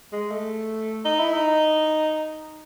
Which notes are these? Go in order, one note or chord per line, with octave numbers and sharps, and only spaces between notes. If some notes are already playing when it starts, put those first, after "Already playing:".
G#3
A3
D#4
E4
D#4